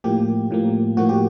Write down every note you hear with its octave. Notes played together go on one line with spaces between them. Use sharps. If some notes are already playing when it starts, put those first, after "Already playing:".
A2 F3 A#3 G4
A2 F3 A#3
A2 F3 A#3 F#4
G4